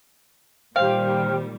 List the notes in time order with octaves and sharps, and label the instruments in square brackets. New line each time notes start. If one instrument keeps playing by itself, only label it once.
[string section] A#2 D#3 G3 [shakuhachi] C5 [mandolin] F5 [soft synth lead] G5